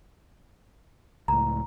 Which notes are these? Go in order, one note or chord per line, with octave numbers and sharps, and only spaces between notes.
C#2 A2 A#5